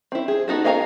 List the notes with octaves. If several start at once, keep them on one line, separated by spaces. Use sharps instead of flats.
C4 E4
G#4
B3 D#4 F#4 A4
A#3 D#5 F5 G#5 A#5